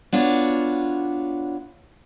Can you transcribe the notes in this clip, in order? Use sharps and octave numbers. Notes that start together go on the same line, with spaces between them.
B3 D4 F4 F#4 C#5